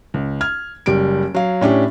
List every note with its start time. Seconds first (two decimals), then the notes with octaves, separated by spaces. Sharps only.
0.14 C#2
0.41 F6 G#6
0.86 F#1 G3 D7
1.34 F#3 F5
1.61 A2 C#4 D4 G4